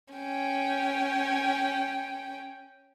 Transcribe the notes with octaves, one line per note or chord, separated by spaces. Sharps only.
C#4 G5